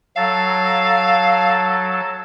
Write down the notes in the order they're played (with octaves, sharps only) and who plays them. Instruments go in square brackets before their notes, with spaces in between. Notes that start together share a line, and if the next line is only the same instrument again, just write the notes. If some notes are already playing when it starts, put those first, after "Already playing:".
[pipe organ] F#3 A4 A5 [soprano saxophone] F5